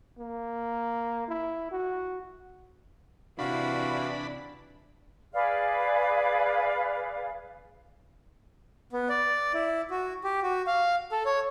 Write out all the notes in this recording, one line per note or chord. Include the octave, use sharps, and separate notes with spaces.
A#3
E4
F#4
C3 E3 D4 E4 F#4 F5 B5
G#4 B4 D5 F5
B3
D5
E4
F#4
G4
F#4
F5
A4
C#5